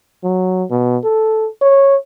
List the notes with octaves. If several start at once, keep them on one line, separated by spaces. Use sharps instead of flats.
F#3
B2
A4
C#5